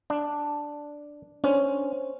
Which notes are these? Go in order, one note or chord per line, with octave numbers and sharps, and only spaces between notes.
D4
C#4 D4 C5 C#5